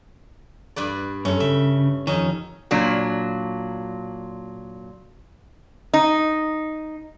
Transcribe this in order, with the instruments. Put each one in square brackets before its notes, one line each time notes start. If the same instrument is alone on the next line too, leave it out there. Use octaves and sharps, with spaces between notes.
[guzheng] G2 B4 D5
[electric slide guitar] F#2 [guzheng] C#4 A4
[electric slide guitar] C#3 [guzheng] E5
[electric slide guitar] F2 D#3 [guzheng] C#4 D#4
[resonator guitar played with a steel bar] A#2 F#3 D4
D#4